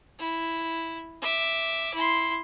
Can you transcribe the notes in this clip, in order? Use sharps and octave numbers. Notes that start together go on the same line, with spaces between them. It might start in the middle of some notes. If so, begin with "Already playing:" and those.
E4
E5 D6
E4 C6